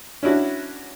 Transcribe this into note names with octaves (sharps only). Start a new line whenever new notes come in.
C#4 D4 E4 F#4